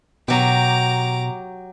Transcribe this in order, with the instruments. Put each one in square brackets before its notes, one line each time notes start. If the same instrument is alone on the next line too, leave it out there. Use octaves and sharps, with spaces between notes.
[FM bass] B2 [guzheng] F#3 G4 [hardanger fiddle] A#5 D6